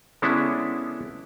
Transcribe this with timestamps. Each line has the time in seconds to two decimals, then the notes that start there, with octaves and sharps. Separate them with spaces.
0.22 D3 G#3 B3 C#4 D4 E4